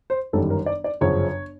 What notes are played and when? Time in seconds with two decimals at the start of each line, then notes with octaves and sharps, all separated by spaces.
0.10 C5
0.33 G1 F#2 D#3 G3 A4
0.50 A#4
0.66 D5
0.84 D5
1.01 G1 F#2 C#3 F3 C#5